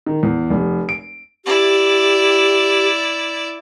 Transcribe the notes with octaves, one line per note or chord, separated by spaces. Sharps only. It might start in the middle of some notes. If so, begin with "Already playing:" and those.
D#3
E2
F1
D7
E4 G4 D5